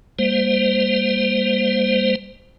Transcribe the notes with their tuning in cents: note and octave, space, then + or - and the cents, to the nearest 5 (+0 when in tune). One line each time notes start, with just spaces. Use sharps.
G3 +35 A#3 +0 C5 -10